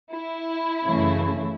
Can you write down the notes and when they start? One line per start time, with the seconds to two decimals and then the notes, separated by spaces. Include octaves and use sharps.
0.11 E4
0.86 F#2 C#3 E3 A3